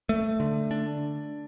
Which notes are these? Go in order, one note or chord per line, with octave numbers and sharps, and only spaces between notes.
A3
D3
D4